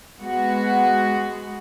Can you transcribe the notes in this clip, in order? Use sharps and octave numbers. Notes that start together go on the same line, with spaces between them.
G#3 B3 F#4